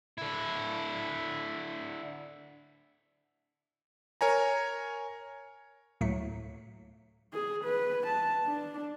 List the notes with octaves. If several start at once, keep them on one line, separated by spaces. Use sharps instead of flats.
D3 E4
A#4 C#5 G#5 A#5
D2 A2 F#3 A3 B6 C#7
G#4
B4
A5
D4